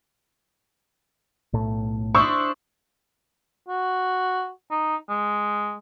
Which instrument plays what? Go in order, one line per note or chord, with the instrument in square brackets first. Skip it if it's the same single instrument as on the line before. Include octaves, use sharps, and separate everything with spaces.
[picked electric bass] B1 A2 A3
[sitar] D4 E4 C5 [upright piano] C#6 D#6 E6
[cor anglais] F#4
D#4
G#3